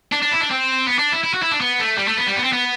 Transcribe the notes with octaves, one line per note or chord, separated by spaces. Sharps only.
D4
D4
E4
D4
C4
B3
D4
E4
E4
F#4
E4
D4
B3
A3
G3
A3
B3
G3
B3
C4
B3